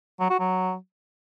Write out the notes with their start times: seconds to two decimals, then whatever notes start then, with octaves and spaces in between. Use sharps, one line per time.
0.20 F#3
0.30 F#4
0.40 F#3